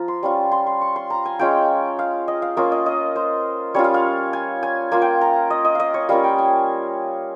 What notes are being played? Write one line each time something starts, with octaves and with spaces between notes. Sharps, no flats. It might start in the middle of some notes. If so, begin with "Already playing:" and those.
Already playing: F3 F4 A#5
C6
G3 C#4 F4
C6
C6
C#6
C6
A#5
G#5
G#3 C#4 F4 G5
F5
D#5
F5
A#3 C#4 F4 D#5
D#5
D#5
C5
G3 C#4 F4 C#5
F5
F5
G#5
G#5
A#3 F4 G#5
G5
A#5
D#5
D#5
D#5 F5
C#5
G3 A#3 C#4 F4 F5
G5
G#5